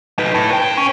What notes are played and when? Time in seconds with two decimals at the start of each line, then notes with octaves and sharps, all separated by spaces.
0.19 D#4 B4
0.34 A2
0.51 B4 G5
0.77 C#4